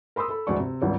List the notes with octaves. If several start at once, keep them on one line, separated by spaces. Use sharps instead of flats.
A#4 B5 C6 D#6 E6
A4 B5
F1 D2 G#3 D5 C#6
C3
G#1 C#2 G2